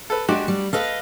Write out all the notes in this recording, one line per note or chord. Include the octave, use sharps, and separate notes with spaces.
A4 B4
G#3 D4 F#4 G4
G3
A4 B4 D#5 F5